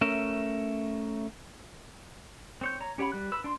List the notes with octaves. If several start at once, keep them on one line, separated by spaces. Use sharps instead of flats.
A3 C#4 A#4 E5
C4 C#5 G6
C#5 A#5
C#4 G4 C#5 F#5 B5
G3 F#6
B4 E6
D4 C6